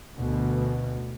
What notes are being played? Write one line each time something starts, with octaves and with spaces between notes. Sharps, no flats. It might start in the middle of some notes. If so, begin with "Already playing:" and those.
D2 B2